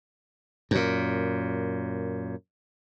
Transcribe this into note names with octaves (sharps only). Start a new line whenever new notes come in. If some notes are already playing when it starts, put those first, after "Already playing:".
F#2 A#2